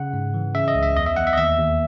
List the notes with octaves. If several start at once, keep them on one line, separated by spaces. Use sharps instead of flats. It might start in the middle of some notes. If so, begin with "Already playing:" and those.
Already playing: C#3 F#5
G#2
E3
C#3 E5
D#5
C#2
E5
E2 D#5
E5
E2 F#5
E5
D#5
D#2 E5
D#2